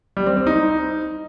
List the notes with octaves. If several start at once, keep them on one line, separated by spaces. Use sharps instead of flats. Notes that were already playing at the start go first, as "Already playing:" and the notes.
G3
C4
C4
D#4